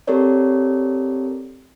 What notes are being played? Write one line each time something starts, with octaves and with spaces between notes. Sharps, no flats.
C4 G4 A4 A#4 C#5 D5